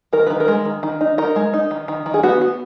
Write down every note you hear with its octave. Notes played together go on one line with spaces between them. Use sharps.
D#3 A#4
D#3 B4
A#4
G#3
D#3
D#3
D#4
D#4 A#4
G#3
D#4
D#3
D#3
D#3
G#4
B3 F#4
B3